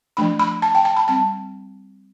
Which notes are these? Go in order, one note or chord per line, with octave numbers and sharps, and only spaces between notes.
F3 A3 D4 B5
B5
A5
G5
A5
B5
G3 C4 A5